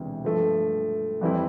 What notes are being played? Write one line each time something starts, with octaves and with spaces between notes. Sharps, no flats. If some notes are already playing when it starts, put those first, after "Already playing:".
Already playing: E1 D2 C3 E3
G2 F3 A3
F2 E3 G3 C4 E4